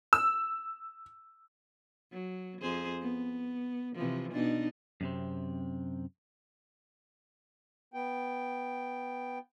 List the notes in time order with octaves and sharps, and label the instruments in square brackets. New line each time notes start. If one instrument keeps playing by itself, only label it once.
[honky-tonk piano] E6
[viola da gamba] F#3
F2 G#4 C5
B3
C3 E3 F3
B2 D4 D#4
[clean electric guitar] F#2 C3 C4
[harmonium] B3 G5